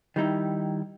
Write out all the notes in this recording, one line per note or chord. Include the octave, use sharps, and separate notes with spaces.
D#3 G3 D#4 E4